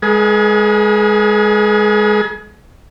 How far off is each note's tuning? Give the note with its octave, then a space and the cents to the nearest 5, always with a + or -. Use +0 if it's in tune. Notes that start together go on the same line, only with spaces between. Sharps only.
G#3 -5 G#4 +30 B4 -45